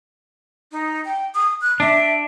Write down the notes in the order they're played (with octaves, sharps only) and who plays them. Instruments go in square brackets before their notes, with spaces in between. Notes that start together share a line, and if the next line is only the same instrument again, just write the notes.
[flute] D#4
G5
D#6
F#6
[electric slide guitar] D4 [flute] E5